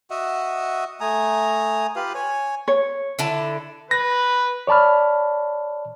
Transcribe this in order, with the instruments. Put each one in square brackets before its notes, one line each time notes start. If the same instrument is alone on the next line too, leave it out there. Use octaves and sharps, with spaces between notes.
[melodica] F#4 D#5 E5 F#5
A3 G#5 A#5 D#6
F4 G4 B4 F5
C#5 G#5
[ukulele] C#5
[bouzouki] D3 E4 A5
[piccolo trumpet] B4 [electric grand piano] A#6
[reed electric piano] C#5 D5 A5 B5 F6